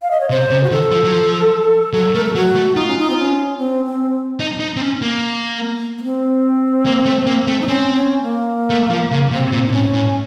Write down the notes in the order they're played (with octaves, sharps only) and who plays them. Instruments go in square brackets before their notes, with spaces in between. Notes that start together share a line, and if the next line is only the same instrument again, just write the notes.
[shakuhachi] F5
D#5
C#5
[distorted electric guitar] C3 [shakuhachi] C5
[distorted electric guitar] C#3
[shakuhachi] F#4
[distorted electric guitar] D#3 [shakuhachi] A4
[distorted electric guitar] F3
F#3
F3
[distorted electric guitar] F#3 [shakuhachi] A4
[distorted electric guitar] A3 [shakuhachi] A#4
[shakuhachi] A4
[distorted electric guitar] F#3 [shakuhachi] F#4
[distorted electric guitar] A3
[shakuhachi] D#4 [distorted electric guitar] F4
[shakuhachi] C#4
D#4
C4
C#4
C4
C4
[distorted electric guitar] D#4
D#4
C4
C#4
A#3
[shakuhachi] A#3
C4
[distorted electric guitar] A#3
A3
A#3
A3
[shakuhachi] D#4
[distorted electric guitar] C4 [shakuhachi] C#4
[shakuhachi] C#4
A#3
[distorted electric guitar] A3
F3
C#3
[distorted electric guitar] C3 [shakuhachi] C4
[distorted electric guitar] A#2
[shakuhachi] D#4
[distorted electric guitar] A2 [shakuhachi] C#4
[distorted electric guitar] A2